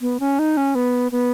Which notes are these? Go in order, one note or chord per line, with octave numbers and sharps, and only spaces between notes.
B3
C#4
D#4
C#4
B3
B3